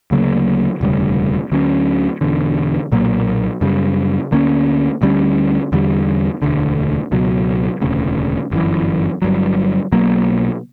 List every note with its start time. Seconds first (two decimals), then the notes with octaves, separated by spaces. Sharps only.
0.11 D2 C#3 F#3 A#3
0.81 E1 D2 C#3 G3
1.52 D2 D3 F#3 C#4
2.21 E1 E2 D3
2.92 B1 A#2 F#3 A#3
3.61 F#2 C#3 G3
4.32 D2 D3 A#3 C#4
5.02 D2 D3 G3 C#4
5.72 E2 D3 G3
6.42 E1 D2 D3
7.12 C#2 B2 F#3
7.81 E1 D2 C#3
8.51 G1 F#2 E3
9.22 G1 G2 F#3
9.92 B1 B2 F#3 A#3